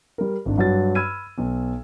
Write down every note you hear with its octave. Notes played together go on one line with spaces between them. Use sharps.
G3 A#4
G#1 D4
G2 F#3 F#4 C#5 A6
B5 E6 F6 G#6 D#7
B1